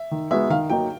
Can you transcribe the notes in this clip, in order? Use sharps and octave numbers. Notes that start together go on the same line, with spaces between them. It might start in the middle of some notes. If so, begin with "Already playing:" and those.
Already playing: E5
D#3
G#3 B3 D#4 F#4 E5
D#3 F5
F#3 A#3 D#4 G5